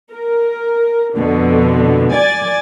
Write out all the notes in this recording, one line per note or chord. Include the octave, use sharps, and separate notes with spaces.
A#4
F2 B2 D3
D5 G#5 A6